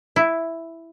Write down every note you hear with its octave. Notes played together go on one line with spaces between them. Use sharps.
E4